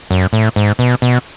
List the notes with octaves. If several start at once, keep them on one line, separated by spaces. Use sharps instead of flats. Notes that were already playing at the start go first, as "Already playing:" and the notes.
F#2
A2
G#2
B2
B2